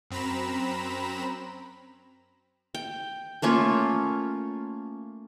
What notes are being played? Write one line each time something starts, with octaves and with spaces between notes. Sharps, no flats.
F#2 C4 A#5 B5 E7
G5
A3 A#3 C#4 F4